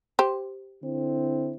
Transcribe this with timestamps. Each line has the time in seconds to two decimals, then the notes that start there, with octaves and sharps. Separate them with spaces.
0.19 G4 C5
0.82 D3 C4 E4